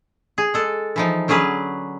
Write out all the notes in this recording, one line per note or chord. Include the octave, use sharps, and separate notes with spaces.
G#4
G#3 A4
E3 F3 D#4
D3 F#3 C#4 G#4 B4